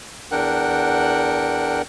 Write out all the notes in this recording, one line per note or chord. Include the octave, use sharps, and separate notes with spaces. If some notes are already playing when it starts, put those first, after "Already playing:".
E2 D4 A#4 F#5 G5 F#6